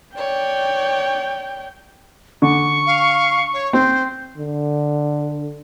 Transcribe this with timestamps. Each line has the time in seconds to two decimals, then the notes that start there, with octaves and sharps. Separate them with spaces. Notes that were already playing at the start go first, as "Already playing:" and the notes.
0.16 C#5 D5 G5
2.42 D3 C#6
2.86 F5
3.53 C#5
3.73 C4 C5
4.37 D3